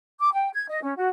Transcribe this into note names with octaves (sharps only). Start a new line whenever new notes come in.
D6
G5
G#6
D#5
C#4
F#4